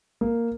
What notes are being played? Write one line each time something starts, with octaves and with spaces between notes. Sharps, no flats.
A#3